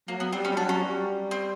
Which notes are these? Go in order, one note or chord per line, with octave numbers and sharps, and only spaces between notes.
F#3 A#3
B3
G3 C4
C#4
G3
F#3 D4
C#4
G3
C4